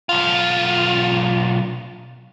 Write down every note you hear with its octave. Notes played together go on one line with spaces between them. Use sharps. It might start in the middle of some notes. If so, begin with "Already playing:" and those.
B1 F4